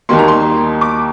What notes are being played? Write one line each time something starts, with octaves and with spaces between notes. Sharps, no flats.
D#2 D#3 G3 A#3 C6
A#5
C6
D6